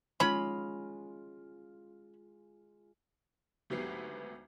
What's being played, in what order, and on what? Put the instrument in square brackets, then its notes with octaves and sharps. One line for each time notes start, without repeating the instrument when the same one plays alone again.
[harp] G#3 F4 [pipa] C#4 B5
[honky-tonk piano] G#1 D2 F#3 B3 G4 C7